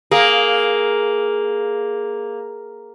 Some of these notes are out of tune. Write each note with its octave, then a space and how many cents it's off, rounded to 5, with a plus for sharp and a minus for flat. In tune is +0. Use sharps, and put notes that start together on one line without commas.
A#3 +0 G#4 +0